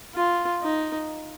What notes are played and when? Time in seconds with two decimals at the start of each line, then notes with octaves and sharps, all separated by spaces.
0.15 F4
0.62 D#4